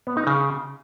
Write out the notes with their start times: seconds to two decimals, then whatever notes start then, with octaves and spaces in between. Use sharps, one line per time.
0.07 B3
0.17 D#4
0.27 C#3